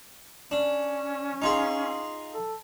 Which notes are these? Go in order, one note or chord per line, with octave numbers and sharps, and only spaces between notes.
C#4 D4
D#4 F4 G#4
A4